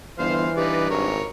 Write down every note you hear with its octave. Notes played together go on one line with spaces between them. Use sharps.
G1 E3 C5 F5
G2 D#4 B4 D5
G#1 A#4 C#5